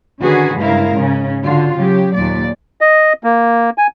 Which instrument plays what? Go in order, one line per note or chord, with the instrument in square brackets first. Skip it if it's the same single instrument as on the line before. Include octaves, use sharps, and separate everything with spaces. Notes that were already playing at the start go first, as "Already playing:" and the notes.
[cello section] D3 D#3 C#4 F#4 G#4 B4
G2 C#3 G#3 E4 A#4 F5
G#2 C#3 C#4
D3 F4 F#4
C#3 F#3 G4
D#2 A#2 D5
[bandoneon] D#5
A#3
G#5